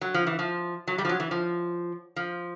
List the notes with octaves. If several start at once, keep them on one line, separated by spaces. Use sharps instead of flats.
F#3
F3
E3
F3
F#3
G3
F3
F#3
E3
F3
F3